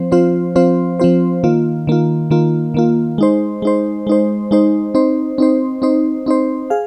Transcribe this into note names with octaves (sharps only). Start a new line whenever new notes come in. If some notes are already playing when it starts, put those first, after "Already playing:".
Already playing: F3 C4 C5
F3 C4 F4 C5
F3 C4 F4 C5
F3 C4 F4 C5
D#3 A#3 F4
D#3 A#3 F4
D#3 A#3 F4
D#3 A#3 F4
G#3 D#4 C5
G#3 D#4 C5
G#3 D#4 C5
G#3 D#4 C5
C4 D#4 C5
C4 D#4 C5
C4 D#4 C5
C4 D#4 C5
G#4 F5